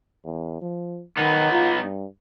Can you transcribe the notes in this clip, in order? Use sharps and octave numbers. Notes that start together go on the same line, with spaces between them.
E2
F3
D#3 B3 D#4
F4
G2